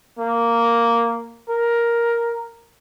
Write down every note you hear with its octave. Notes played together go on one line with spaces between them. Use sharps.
A#3
A#4